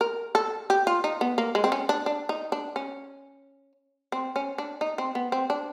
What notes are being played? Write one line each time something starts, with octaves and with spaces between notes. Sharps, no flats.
A#4
A4
G4
F4
D#4
B3
A#3
G#3
C4
C#4
D4
D4
D#4
D4
C#4
C4
C#4
D4
D#4
C4
B3
C4
D4